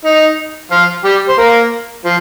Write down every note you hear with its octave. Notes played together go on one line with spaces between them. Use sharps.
D#4
F3 F4
G3 G4
C5
A#3 A#4
F3